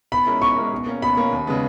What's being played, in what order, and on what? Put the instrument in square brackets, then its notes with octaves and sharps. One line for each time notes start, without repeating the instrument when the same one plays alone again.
[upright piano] B2 [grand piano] B5
[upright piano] G#3 C#4 E4 A#4
[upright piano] B2 [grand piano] C#6
[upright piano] G#3 C#4 E4 A#4
B2
A#3 C#4
[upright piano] B2 [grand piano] B5
[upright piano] A#3 C#4
D#2
C#3 G#3 B3